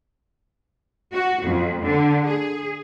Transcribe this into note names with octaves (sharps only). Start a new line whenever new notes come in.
F#4
F2
D3
G#4